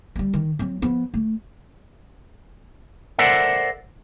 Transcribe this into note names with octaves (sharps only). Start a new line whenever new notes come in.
G3 G#3
D#3
F#3 C4
F3 B3
A3
A4 A#4 C5 D5 E5 F#5